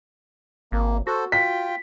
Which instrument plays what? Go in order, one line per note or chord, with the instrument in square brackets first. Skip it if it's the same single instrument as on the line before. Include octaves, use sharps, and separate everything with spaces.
[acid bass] G#1 [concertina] A#3
[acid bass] F#4 [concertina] A4 C5
[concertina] F4 G5 [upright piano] B6